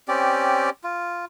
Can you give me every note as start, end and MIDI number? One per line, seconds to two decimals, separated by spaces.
0.08 0.70 60
0.08 0.70 61
0.08 0.70 67
0.08 0.70 74
0.84 1.25 65